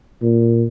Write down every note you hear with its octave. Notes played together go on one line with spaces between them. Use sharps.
A#2